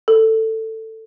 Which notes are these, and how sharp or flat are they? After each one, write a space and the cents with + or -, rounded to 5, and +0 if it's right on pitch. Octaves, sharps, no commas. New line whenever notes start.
A4 +15